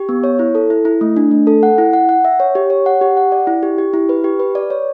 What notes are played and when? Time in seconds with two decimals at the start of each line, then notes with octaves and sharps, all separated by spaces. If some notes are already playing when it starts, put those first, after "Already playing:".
Already playing: G4
0.09 B3
0.24 C#5
0.39 E4
0.55 A4
0.70 E4
0.85 E4
1.01 A3
1.17 D4
1.31 A3
1.47 A4
1.63 F#5
1.78 E4
1.93 F#5
2.09 F#5
2.25 E5
2.40 C#5
2.55 G4
2.70 C#5
2.86 F#5
3.01 G4
3.17 F#5
3.32 D5
3.47 E4
3.63 G4
3.78 G4
3.94 E4
4.09 B4
4.24 G4
4.40 B4
4.55 D5
4.70 C#5